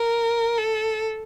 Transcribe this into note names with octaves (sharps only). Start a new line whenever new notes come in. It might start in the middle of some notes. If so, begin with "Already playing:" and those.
Already playing: A#4
A4